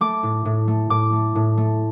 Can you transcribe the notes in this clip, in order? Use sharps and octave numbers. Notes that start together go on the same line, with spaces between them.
A3 D6
A2
A2
A3
A2 D6
A3
A2
A3